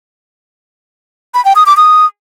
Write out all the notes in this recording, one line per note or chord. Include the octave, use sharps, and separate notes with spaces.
B5
G5
D#6
D6
D#6